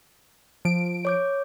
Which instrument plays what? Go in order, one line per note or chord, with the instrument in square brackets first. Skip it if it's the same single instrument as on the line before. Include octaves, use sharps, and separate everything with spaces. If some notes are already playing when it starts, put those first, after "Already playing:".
[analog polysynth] F3 D7
[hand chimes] C#5 D6 G6